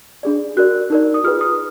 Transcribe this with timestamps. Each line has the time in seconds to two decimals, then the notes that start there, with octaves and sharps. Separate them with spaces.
0.23 D4 G#4 D5
0.57 F#4 A#4 D5 F#6
0.90 D#4 A#4 D5
1.14 D#6
1.24 F4 G#4 B4 F6
1.41 D#6